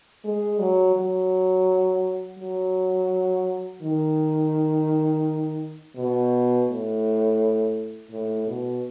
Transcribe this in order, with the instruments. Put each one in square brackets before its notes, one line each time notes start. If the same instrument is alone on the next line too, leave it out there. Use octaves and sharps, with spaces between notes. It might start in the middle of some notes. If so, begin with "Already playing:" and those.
[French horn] G#3
F#3
F#3
F#3
D#3
B2
A2
A2
B2